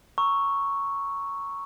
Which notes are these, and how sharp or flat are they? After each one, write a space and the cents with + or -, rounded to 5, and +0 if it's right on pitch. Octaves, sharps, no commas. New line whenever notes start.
A#5 +0 C#6 +0 E6 +0